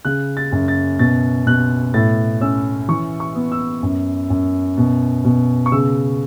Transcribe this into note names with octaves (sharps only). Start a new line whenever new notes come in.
C#3 F#6
A6
F#2
A6
B2 A6
B2 F#6
A2 A6
C#4 E6
E3 C#6
C#6
B3
E6
F#2
F#2
B2
B2
C#6
C#3 E6